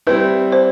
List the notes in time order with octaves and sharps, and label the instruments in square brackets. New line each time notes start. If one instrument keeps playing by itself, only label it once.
[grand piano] G3 C4 E4 [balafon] B4
[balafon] C5